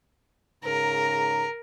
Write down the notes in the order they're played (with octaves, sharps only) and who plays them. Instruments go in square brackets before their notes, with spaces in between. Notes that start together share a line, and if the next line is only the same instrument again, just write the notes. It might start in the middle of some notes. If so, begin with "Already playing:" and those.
[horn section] G#2 C#3 A#5 [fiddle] A#4